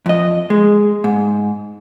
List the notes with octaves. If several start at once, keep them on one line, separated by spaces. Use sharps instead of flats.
F2 D#5
G#3
G#2